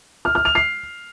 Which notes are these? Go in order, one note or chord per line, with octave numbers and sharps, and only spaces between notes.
F6
F6
F7
C7